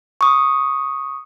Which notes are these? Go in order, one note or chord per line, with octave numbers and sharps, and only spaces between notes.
C#6 D#6